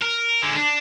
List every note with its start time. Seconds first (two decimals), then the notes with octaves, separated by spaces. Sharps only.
0.02 A#4
0.42 D3 G#3
0.55 D4